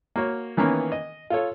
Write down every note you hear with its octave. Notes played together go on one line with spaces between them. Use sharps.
A#3 F#4 C#5
D#3 E3 A#3 B3 C#4
D#5
F4 A4 C#5